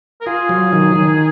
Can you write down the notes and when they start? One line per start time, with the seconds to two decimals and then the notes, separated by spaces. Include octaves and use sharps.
0.21 A#4
0.26 F4 G#4
0.49 F#3
0.73 D#3
0.95 D#3